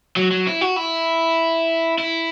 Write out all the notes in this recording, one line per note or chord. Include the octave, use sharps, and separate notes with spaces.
F#3
F#3
E4
F#4
E4
E4